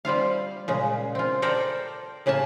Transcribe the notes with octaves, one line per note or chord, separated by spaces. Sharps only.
G3 C4 F4 F5
A#2 C#3 G#3
C4 F4
A4 A#4 C5 D5 G5
A2 C#3 A#3 G#5 A5